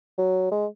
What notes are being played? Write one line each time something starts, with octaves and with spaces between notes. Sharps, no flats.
F#3
G#3